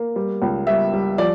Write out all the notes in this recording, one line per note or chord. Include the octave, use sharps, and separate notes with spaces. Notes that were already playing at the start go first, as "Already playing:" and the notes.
Already playing: A#3
G3
C#2
G3 E5
G3
F3 D5